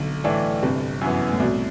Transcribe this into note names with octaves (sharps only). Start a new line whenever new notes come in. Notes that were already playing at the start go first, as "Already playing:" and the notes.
Already playing: B1 D3
A2 E3 A3 D4
G1 C3
F#2 E3 B3
A2
C2 B2